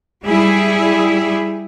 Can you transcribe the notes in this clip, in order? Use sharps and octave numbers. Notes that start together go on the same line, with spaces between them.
G3 E4 G#4